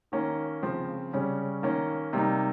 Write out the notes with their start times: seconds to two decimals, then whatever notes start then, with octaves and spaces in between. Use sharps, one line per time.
0.12 D#3 A#3 C#4
0.63 C#3 F3 C4
1.13 C#3 G3 C#4
1.62 D#3 A#3 C#4
2.13 C3 G3 A#3 D#4